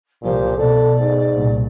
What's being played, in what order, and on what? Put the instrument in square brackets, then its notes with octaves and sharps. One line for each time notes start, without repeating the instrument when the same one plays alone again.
[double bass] C2 F3 [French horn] A#2 [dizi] G4
[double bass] B2 [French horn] A4 [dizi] D5
[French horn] G#2
[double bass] C2 A#2